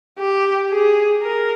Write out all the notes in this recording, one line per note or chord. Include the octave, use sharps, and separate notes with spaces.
G4
G#4
A#4